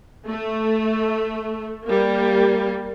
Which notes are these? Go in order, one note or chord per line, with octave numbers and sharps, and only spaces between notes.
A3
G3 A#3